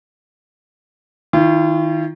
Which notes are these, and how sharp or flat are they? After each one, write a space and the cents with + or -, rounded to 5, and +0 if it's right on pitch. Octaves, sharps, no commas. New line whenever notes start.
D#3 +20 F4 -40